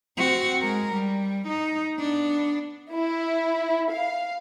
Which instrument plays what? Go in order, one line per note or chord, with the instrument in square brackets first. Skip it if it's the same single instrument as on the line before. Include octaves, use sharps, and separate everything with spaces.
[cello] C4 F#4
G#3 A#4
G3
D#4
B3 D4
[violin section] E4
F5